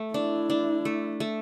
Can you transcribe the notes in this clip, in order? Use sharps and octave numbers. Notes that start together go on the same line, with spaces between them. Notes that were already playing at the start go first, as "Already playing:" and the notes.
Already playing: A3
D4 E4
D4
A3
A3